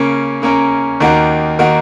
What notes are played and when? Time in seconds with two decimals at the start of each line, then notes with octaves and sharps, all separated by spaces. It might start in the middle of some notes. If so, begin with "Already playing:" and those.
Already playing: C#3 A#3 C#4 A#4
0.42 C#3 A#3 C#4 A#4
1.00 D#2 D#3 A#3 D#4 F#4
1.59 D#3 A#3 D#4 F#4